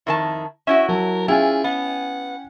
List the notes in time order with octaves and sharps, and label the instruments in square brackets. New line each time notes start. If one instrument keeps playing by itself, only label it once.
[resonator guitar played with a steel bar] F2 D#3 A5 [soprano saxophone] E4
[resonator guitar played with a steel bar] C#4 E4 F#4 [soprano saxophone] E5
[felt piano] F#3 A5 [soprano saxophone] A#4
[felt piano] C#4 G5 G#5 [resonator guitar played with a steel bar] E4 F4 [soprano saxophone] G#4
[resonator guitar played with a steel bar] B3 [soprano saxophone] F#5